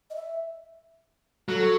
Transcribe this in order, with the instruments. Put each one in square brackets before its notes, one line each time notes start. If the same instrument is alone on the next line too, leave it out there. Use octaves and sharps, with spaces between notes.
[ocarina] D#5
E5
[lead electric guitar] F#3 [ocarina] A4